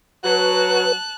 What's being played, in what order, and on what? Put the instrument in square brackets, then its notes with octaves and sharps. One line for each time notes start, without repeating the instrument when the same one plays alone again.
[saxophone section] F#3 F#4 [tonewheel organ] B4 [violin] A5 F#6